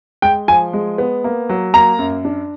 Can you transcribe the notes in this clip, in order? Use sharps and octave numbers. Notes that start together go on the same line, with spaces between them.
G#3 G5
F3 G#5
G#3
B3
A#3
F#3
A#3 A#5
F#2
D4